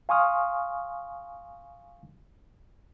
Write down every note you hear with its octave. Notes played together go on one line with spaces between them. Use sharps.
F5 G#5 C6 C#6 D#6 F6